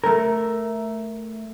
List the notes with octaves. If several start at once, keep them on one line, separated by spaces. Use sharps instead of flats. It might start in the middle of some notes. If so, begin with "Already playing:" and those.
A3 A#4